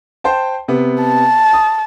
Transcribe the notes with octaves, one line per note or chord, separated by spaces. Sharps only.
C5 G5 A5
C3 B3
A5
D#6